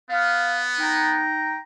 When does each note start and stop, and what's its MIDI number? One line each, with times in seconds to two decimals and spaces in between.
0.10 1.24 59
0.10 0.61 77
0.79 1.57 63
0.79 1.57 79
0.79 1.57 82